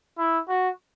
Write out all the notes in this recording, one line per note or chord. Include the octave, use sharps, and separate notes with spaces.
E4
F#4